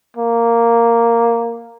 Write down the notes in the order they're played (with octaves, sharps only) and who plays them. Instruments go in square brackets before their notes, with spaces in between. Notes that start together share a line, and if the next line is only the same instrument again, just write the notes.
[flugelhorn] A#3